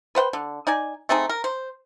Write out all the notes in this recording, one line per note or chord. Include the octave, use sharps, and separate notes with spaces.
B4 C5 F#5 G5
D3
D#4 D5 G#5
A3 C4 D#4 G#4
A#4
C5